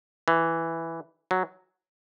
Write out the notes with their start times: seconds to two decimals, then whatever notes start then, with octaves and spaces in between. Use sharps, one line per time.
0.28 E3
1.31 F#3